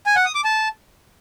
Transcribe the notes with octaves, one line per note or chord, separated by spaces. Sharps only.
G#5
F#5
D#6
D6
A5